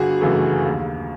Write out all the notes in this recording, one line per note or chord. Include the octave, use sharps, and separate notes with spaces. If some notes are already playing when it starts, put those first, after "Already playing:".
Already playing: G1 F#4 G#4
F#2 C#3 E3 A3
D#2